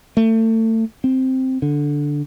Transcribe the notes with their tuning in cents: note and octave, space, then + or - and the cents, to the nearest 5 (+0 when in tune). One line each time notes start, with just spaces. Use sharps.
A3 +30
C4 +0
D3 -5